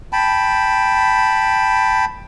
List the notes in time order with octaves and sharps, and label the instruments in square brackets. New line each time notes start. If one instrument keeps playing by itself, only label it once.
[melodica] G5 A5 B5